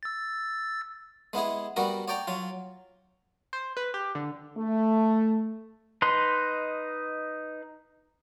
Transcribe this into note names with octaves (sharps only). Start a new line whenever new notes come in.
E6 A6
G#3 B3 E4 G#4
G3 B3 F#4 A#4
C#5 D5 G5 A#5
F#3 F4
C5
B4
G4
D3
A3
D#4 B4 D#5 C6